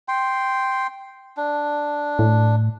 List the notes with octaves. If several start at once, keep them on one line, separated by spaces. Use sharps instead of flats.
G5 C6
D4
A2